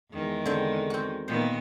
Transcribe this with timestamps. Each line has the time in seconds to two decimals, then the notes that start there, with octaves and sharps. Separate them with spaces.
0.12 E2 D#3 G#3
0.46 D3 C4
0.90 C4 F#4
1.28 A#2 D#3 B3 C5